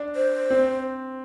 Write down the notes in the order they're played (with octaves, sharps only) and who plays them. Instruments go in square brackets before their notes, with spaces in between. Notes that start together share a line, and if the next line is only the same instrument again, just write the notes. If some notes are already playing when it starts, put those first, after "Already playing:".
Already playing: [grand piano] D4
[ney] C5
[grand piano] C4